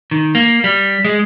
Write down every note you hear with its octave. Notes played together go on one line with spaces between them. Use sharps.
D#3
A#3
G3
G#3